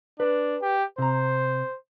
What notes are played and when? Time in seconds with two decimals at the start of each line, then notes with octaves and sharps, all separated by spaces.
0.20 D4 B4
0.62 G4
0.98 C3 C5 A#5